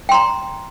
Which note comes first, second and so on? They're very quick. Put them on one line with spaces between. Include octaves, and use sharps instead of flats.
G5 C6 A#5